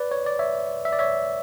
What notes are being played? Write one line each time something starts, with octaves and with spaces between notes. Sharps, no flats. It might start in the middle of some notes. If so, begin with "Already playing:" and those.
Already playing: B4 D5
C#5
D5
C#5 E5
E5
D5
C#5 E5